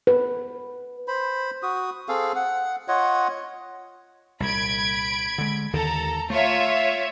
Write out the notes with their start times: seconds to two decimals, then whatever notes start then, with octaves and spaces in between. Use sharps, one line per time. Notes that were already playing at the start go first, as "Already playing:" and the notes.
0.07 B4
1.08 C5 B5
1.63 F#4 D#6
2.08 C4 G#4 A4 F5
2.35 F#5
2.88 F4 C#5 D#5 F#5
4.40 C2 A#2 B5 G#6 D7
5.38 D3 G#3
5.74 D#2 D3 D#3 A4 A#5
6.30 A3 F4 C#5 E5